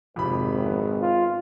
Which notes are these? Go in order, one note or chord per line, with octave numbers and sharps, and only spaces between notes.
G#1 F2 C3 B5
B3
F4